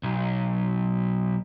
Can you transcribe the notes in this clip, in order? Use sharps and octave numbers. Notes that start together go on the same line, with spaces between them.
B1